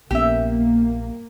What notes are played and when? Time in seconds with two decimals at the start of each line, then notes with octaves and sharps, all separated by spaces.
0.11 A#1 A#3 B3 C#4 G4 E5